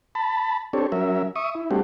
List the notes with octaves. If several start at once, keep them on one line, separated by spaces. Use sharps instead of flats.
A5 B5
C4 D4 G4 A4 C#5
F#3 C#4 A#4 E5
E5 C#6 D#6
E4
G3 A3 C4 D4 F#4 G4